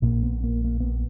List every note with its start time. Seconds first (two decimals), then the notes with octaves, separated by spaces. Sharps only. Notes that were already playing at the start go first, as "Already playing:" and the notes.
0.02 A#1 A#2 A#3
0.23 B3
0.44 A#3
0.64 A#3
0.80 B3